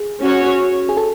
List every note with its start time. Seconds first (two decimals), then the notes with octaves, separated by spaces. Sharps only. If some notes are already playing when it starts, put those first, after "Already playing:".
Already playing: G#4
0.21 C#4 F#4 C#5
0.89 G#4
0.97 A4